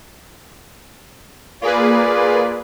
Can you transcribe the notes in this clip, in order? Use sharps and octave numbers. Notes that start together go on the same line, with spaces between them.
A#3 F4 G#4 B4 D5